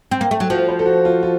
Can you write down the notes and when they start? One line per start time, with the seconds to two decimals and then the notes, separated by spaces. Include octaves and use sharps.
0.11 C4
0.21 A#3
0.31 A3
0.40 F#3
0.50 F3 F#4
0.69 C5
0.79 A4
0.86 F#4
1.05 F4
1.23 F4